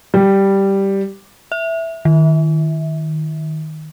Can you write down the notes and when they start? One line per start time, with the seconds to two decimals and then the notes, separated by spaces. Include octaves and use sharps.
0.14 G3
1.52 E5
2.05 D#3